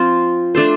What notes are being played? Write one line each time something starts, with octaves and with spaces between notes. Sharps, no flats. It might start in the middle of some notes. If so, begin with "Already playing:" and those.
Already playing: F3 C4 F4 C5
A3 D4 A4 C5